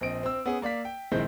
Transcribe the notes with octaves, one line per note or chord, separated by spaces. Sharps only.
A#1 C4 D#5 D7
C4 E6
B3 C#4 G#4
A#3 D5 F5 B6
G5
A#1 D#3 G#3 C4 E4 G6